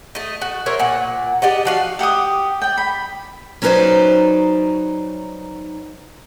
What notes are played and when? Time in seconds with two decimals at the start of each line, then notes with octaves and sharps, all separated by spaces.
0.15 A3 D#5
0.42 F#4
0.66 A#4 C5 C#5 E5
0.79 A#2 F#5
1.42 G4 D5 D#5 F#5
1.65 F3 F#4 F5
1.99 G4 F#5 D6 D#6
2.62 D5 G5
2.78 B5
3.62 F#3 C#4 D#4 B4 C5 D5